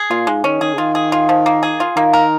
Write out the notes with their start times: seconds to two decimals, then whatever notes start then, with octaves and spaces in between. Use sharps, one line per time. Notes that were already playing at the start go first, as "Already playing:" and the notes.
Already playing: G#4
0.10 A#2 F4
0.27 G#2 G#3
0.44 D#3 C#4
0.61 D#3 G#4
0.73 C#3
0.78 D#3 F4
0.95 G#4
1.12 F4
1.29 F3
1.46 A#3
1.63 G#4
1.80 F4
1.96 D#3 A#3
2.13 A#4